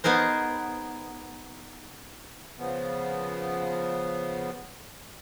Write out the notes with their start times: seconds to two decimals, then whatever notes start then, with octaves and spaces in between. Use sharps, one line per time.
0.04 B3 D#4 G#4 A#4 C5
2.59 C#3 F3 B3